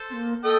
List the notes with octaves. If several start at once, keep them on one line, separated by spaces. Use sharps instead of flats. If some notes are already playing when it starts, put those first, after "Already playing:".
Already playing: A4 C5
C4
A#3
A4 D#5 G5